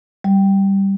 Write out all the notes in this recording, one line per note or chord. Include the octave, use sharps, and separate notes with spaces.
G3